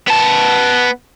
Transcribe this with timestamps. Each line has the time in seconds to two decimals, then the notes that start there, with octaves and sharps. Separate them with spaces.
0.08 B3 A5